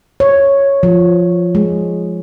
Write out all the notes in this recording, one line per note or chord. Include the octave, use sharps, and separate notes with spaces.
C#5
F3
G#3